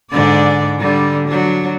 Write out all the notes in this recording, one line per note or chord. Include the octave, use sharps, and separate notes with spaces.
G#2 D3 D5
D3 G3
F#3 D4